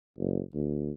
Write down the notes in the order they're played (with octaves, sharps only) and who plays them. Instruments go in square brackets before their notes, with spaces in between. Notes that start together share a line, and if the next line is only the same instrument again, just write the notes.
[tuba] F#1
D2